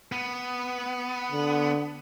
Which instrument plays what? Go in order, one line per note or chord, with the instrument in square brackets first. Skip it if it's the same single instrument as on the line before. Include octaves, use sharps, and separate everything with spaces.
[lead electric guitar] B3
[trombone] D3